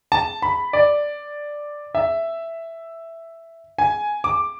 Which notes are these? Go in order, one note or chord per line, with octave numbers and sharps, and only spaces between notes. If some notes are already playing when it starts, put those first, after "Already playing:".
A5
B5
D5
E5
G#5
D6